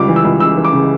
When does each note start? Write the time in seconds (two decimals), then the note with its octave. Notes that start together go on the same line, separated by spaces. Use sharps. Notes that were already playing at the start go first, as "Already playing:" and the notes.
Already playing: C#2 G3 D6
0.08 E3
0.16 E6
0.24 C#2
0.40 C#3 E6
0.57 E3
0.65 D6
0.73 C#3